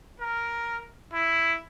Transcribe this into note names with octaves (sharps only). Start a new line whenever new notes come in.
A#4
E4